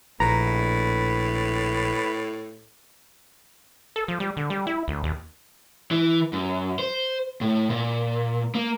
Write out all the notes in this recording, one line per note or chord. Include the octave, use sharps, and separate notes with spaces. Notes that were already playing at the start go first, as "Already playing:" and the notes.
A#1 A2 B4 A#5
A4
F3
G3
D3
G3
E4
D2
D#2
E3
F#2
C5
A2
A#2
A#3